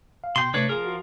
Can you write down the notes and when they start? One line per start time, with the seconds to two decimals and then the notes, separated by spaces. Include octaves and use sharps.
0.24 F5
0.36 B2 G5 C6
0.54 C3 A3 D4 B4 C#5
0.69 F3 F4 G#4 A#4
0.85 F#4